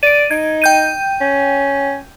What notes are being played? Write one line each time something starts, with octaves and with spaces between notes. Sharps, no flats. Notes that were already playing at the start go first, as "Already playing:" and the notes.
D5 D7 D#7
D#4 G#6
G5 G6 D#7
C#4